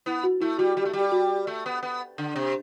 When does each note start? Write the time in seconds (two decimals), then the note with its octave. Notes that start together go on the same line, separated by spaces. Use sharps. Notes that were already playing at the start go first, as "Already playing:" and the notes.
0.06 B3 E4
0.24 F#4
0.41 A3 E4
0.58 G3 F#4
0.76 G3 G4
0.85 A3
0.93 G3
1.00 G4
1.12 F#4
1.47 A3
1.66 B3
1.83 B3
2.18 D3
2.36 C3